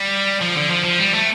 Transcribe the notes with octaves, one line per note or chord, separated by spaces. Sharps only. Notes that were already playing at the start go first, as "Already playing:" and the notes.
Already playing: G3
F3
D3
F3
F3
G3
A3